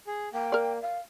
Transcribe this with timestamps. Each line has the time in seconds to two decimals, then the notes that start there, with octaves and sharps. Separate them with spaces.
0.07 G#4
0.33 A#3 G5
0.52 A#4 D5
0.81 F5